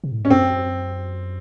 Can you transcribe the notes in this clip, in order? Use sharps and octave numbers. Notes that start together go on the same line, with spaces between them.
C3
A2
G#2
C#4
F#2 C4